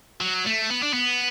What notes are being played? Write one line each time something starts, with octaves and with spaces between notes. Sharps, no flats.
F#3
A3
B3
D4
B3